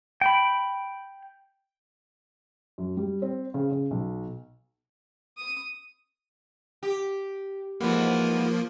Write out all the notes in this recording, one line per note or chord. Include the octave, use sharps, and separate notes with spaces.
G5 B5
F#2
G3
C4
C#3
C#3
B1
D#6
G4
G#2 E3 F3 A#3 B3